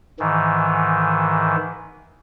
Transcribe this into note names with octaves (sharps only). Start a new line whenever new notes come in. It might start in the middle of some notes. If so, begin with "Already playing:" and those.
G#2 D#3 E3